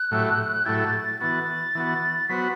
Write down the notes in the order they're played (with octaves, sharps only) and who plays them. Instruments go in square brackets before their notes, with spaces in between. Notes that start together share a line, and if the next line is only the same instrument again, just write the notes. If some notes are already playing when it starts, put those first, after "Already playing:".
Already playing: [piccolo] F#6
[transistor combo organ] A2 F#3 A3 E4 G4
[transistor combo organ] A2 F#3 A3 E4 G4 [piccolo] A6
[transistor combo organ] E3 B3 F#4 [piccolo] A6
[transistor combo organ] E3 B3 F#4
[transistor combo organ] F#3 B3 F#4 C5 [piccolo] B6